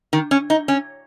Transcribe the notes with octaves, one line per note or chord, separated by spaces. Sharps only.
D#3
C#4
D#4
C#4